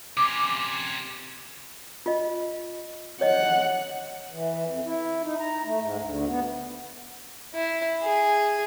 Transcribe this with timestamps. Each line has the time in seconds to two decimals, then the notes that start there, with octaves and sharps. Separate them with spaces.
0.17 C3 C#4 D6
2.06 F4 D#5
3.21 C#5 D#5 F#5
4.31 E3
4.67 F2
4.85 E4
5.22 D#4
5.39 A#5
5.65 A3
5.79 G#2
6.00 D2
6.28 B3
7.54 E4
8.02 G#4